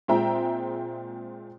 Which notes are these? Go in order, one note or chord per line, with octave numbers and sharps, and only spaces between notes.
A#2 G#3 C4 E5 G5 A#5